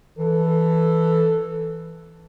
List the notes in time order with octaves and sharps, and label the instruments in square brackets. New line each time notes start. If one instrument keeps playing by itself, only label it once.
[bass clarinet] E3 [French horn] A4